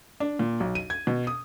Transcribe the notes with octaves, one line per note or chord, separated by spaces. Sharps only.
D4
A#2
B1
D#7
G#6
B2
D#6